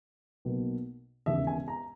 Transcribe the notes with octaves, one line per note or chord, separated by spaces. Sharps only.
B1 B2 A#3
E1 D#2 C#3 E5
G#5
A#5